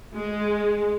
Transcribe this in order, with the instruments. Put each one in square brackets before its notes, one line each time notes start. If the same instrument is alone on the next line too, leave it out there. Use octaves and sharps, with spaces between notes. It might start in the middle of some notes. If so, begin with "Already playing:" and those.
[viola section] G#3